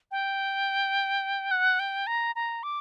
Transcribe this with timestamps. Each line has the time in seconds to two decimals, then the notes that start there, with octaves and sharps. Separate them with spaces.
0.11 G5
1.51 F#5
1.79 G5
2.07 A#5
2.35 A#5
2.63 D6